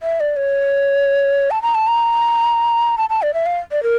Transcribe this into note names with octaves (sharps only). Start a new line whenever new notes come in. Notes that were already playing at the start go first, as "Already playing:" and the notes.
E5
D5
C#5
A5
A#5
A5
A#5
A5
A5
D5
E5
F5
D5
A#4